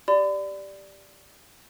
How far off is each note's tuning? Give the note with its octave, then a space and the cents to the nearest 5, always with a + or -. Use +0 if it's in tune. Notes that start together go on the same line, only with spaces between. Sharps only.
G4 +0 D5 +0 B5 +40